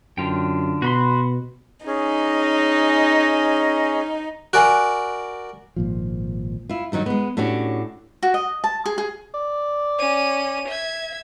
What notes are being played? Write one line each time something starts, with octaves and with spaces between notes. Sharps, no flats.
F#2 D3 F4 G5
B2 F#4 B5 C6
C#4 D#4 G#4
F#4 A#4 D5 G#5 F#6
G#1 A#2 F3
E4 F4
G2 D#3 F#3 D#4
G#3 B3
A2 C#4 D4 F#4 G4
F#4
D#5
A5
G#4
G#4
D5
C#4 D#7
E5 G#6